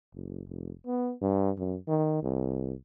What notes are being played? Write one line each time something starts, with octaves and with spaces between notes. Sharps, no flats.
F#1
F1
B3
G2
F#2
D#3
C2